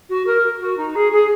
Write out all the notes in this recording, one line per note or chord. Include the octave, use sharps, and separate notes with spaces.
F#4
A#4
F#4
D#4
G#4
G#4